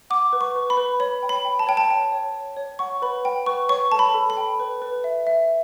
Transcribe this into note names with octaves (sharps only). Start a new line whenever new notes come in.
F#5 D6
B4
C#6
B4
B5
B4
C#5 B5
G5
B5
G5
A5
C#5 G5
A5
G5
C#5
C#5
C#5
F#5 C#6
B4 B5
F#5 G5
B4 C#6
C#5 C#6
A4 A5
B5
A4
B5
G5
B4
B4
E5
E5